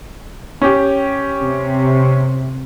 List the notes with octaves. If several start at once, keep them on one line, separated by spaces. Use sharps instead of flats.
C#4 G4
C3